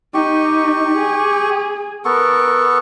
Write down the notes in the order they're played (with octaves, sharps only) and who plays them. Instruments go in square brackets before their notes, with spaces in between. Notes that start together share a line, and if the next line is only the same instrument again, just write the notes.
[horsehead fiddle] D#4 [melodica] G4 C#6
[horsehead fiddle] G#4
[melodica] B3 A4 C#6 [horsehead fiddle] A#4